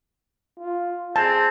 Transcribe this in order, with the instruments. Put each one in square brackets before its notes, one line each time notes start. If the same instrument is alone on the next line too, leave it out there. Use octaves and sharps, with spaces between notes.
[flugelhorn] F4
[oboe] C4 [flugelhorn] G#4 [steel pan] A5